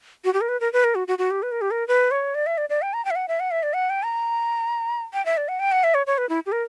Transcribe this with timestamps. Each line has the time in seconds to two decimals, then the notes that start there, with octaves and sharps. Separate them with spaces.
0.25 F#4
0.34 G4
0.41 A#4
0.49 B4
0.61 A#4
0.73 B4
0.84 A#4
0.95 F#4
1.08 F#4
1.18 F#4
1.31 G4
1.43 B4
1.52 A#4
1.61 G4
1.71 A#4
1.88 B4
2.11 C#5
2.35 D5
2.46 E5
2.58 D5
2.69 D5
2.82 G5
2.93 A#5
3.05 G5
3.11 E5
3.16 F#5
3.28 E5
3.40 F#5
3.51 E5
3.63 D5
3.74 F#5
3.90 G5
4.05 A#5
5.14 G5
5.25 E5
5.37 D5
5.48 F#5
5.60 G5
5.72 F#5
5.84 E5
5.94 C#5
6.07 C#5
6.18 B4
6.29 E4
6.46 G4
6.52 A#4